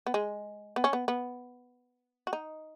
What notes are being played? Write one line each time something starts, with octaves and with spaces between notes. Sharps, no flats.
B3
G#3
B3
C#4
B3
B3
F#4
D#4